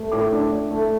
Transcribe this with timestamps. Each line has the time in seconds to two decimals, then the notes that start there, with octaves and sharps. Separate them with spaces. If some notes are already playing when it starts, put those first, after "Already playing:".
Already playing: A3
0.12 A2 D6
0.32 D4
0.51 A2
0.71 A3